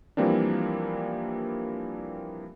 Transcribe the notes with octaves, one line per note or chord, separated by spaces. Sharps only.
E3 F3 G3 A#3 C4 D4